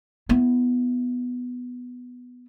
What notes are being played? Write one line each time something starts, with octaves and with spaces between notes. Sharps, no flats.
B3 E4